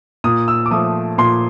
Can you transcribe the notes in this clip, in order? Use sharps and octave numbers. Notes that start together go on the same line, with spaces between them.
A#2 D#6
E6
D6
F3 A3 D#6
A#2 C6